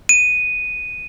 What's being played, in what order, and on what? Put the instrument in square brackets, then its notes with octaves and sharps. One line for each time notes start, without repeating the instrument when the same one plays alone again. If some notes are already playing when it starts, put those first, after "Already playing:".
[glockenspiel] D#7